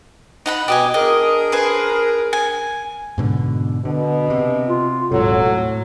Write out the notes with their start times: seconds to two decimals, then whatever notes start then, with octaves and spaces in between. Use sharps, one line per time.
0.46 D#4 F#5 B5
0.68 B2 G4 D#5 G#5
0.94 D4 G#4 A#4 D#5
1.52 B4 C5 G#5
2.33 G#5
3.18 G#2 B2 D3
3.85 B2 D3
4.30 C3
4.67 F4
5.12 D#1 G#2 C3 F#3 A4
5.45 A2